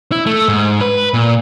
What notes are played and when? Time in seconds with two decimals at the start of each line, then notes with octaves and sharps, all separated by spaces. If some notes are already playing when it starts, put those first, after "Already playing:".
0.12 E4
0.26 A3
0.48 G#2
0.81 B4
1.14 A#2